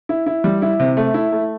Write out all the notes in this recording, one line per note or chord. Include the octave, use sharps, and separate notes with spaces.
E4
E4
G3
E4
C3
A3
E4
A3